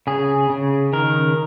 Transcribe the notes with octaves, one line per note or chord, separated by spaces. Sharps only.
C#3 G#4
C#3
D#3 A#4